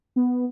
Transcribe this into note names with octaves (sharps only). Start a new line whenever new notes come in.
B3